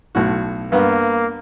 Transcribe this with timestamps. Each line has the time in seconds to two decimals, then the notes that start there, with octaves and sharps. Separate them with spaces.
0.15 B1 A2 F#4
0.72 G2 A#3 B3